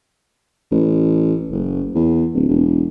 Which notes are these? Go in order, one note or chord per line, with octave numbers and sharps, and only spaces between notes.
A1
F#1
E2
D1
E1